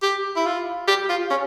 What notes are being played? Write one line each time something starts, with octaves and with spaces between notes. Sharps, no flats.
G4
E4
F4
G4
F4
C#4